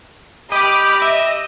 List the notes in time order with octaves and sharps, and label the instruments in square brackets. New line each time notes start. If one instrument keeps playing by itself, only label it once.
[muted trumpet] G4 [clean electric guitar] D#5 [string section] B5 D6 F6
[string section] D#5 [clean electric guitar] E5